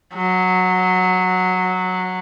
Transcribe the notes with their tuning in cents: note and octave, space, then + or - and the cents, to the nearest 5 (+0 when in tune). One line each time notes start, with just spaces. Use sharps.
F#3 -10